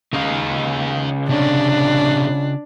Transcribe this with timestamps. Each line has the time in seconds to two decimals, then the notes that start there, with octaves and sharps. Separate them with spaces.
0.13 C#3 D#4 F4 F5
1.30 C3 C#4 D4